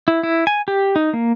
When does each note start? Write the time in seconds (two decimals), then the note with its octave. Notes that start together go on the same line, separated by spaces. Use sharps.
0.08 E4
0.23 E4
0.47 G#5
0.68 G4
0.96 D#4
1.13 A#3